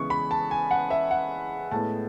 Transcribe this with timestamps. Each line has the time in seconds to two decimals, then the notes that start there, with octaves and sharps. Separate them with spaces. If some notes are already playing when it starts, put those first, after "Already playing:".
Already playing: C#3 E3 G#3 B3 C#6
0.10 B5
0.31 A5
0.51 G#5
0.71 F#5
0.90 E5
1.11 F#5
1.71 A2 G#3 B3 A5